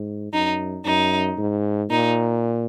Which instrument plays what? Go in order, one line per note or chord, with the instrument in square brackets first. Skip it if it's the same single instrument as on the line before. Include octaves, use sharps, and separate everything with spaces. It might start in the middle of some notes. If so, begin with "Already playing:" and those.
Already playing: [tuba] G#2
[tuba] F#2 [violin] D#4
[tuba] F#2 [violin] D#4
[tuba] G#2
[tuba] A#2 [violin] D#4